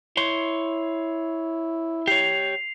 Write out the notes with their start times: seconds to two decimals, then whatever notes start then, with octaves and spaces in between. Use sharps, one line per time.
0.17 E4 C#5 C6
2.08 G4 C#5 C7 F7